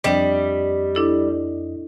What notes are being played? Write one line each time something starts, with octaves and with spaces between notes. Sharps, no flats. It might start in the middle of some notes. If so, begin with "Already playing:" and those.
F2 G3 D4 D#5 G5 B6
D4 E4 A4